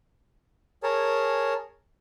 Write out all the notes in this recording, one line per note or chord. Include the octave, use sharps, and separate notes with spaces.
G#4 A#4 C#5 A5